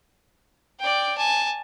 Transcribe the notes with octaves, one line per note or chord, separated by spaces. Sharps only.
D5 G5
G#5 A5